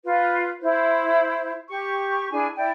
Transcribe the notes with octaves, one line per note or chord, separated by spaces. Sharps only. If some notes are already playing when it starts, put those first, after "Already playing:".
F4 B4
E4 C5
G4 C#6
D4 E4 G#4 G#5
E4 D5 G5